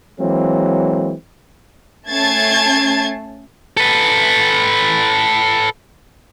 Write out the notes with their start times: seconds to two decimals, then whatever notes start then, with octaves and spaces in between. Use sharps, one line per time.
0.19 E3 F#3 G#3 A#3 C4
2.09 A3 C#4 A5 G#6 A6 C7
3.77 A4 B4